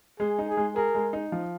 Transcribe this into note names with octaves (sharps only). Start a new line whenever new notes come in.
G#3 G#4
D#4
G#4
G#3
G#4 A#4
G#3
D#4
F3